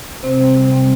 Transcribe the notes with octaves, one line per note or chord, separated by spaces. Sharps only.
C3 C4 C5
G3 C4
C3
G3 C4